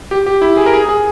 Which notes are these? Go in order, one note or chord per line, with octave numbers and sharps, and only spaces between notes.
G4
G4
E4
G#4
A#4
G#4
G#4